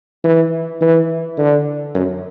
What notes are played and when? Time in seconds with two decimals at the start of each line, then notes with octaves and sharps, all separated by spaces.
0.24 E3
0.81 E3
1.38 D3
1.95 F#2